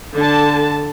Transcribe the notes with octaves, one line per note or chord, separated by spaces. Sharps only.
D3 A5